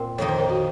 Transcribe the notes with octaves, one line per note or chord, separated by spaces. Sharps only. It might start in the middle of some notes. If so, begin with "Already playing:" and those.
Already playing: A#2 C4
F2 D#3 A#3 D#4 C#5
C5
A#4
F#4